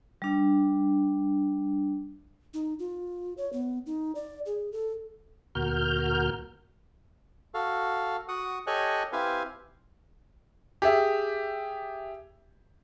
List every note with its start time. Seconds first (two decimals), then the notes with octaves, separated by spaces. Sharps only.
0.22 G3 D4
2.54 D#4
2.79 F4
3.37 C#5
3.53 B3
3.86 D#4
4.15 D5
4.46 G#4
4.72 A4
5.55 D2 A#2 F#4 A#4 F6 G6
7.54 F#4 A4 F5
8.28 F#4 F#5 D#6
8.67 G4 A4 C#5 D#5 G#5 F#6
9.13 C4 E4 G4 B4 F5 G#5
10.82 G4 G#4 E5